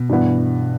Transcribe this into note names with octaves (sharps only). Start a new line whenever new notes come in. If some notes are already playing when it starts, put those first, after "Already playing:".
Already playing: B2
G2 E3 B3